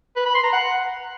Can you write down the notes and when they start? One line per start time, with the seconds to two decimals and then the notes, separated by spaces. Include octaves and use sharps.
0.16 B4
0.26 B5
0.35 C6
0.44 A#5
0.53 F#5